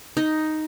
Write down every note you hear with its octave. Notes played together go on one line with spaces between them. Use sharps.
D#4